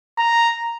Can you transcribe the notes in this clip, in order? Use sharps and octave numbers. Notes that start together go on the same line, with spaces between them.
A#5